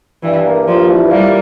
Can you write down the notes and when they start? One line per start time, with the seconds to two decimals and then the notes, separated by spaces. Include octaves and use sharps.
0.23 G2 E3
0.45 A#3
0.67 G2 F3
0.89 E3
1.11 G3 A#3